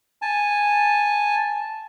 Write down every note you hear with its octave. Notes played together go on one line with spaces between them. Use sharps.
G#5 A5